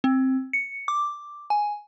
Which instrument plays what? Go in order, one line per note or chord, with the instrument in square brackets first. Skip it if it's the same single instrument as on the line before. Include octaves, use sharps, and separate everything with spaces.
[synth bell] C4
C#7
D6
G#5